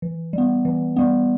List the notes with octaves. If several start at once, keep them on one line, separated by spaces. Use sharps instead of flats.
E3
G3 B3
E3
G3 B3